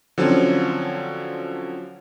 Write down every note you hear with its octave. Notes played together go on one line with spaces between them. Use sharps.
D3 F3 F#3 C4 C#4